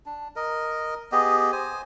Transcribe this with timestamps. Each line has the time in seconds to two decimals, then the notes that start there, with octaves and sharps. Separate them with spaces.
0.06 D4
0.36 A#4 D#5
1.12 B3 G4 G#4 D#5
1.52 C5 G#5